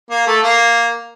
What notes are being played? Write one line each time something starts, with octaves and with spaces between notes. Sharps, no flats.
A#3
A3
A#3